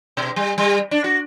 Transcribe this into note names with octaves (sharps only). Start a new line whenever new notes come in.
B2
G3
G3
D4
F#4